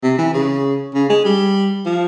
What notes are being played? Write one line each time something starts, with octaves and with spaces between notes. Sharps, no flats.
C3
E3
C#3
C#3
G#3
G3
F3